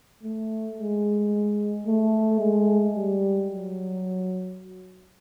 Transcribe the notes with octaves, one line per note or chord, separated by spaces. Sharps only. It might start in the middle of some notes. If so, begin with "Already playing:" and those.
A3
G#3
A3
G#3
G3
F#3